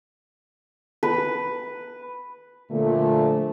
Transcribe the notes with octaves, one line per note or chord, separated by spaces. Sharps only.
B4
A#2 D3 F3 A3